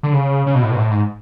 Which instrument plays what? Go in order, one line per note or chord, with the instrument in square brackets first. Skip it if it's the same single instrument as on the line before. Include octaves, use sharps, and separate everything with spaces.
[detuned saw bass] D3
C#3
C#3
B2
A2
B2
G#2
A2
G#2